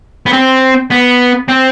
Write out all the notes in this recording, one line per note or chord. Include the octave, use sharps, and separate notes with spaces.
B3
C4
B3
C4